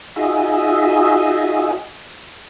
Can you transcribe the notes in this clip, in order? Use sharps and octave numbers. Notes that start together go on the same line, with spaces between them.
D#4 F4 F#4 G#4 D#5 E5